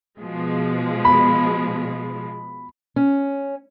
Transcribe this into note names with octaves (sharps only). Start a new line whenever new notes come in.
B2 F3 G#3
B5
C#4